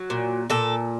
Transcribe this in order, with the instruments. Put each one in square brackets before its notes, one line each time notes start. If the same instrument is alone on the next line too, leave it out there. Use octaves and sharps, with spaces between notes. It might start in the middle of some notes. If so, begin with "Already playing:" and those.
Already playing: [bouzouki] F#3
A#2
A#2 A4